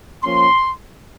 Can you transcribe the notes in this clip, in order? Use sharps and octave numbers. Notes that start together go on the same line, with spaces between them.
F3 A#3 C#4 C6